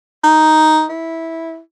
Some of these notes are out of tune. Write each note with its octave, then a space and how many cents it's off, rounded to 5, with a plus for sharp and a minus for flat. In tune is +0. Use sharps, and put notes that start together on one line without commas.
D#4 +5
E4 -10